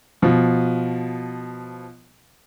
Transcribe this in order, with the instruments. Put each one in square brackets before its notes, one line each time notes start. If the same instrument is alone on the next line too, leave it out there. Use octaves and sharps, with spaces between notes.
[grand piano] B2 F3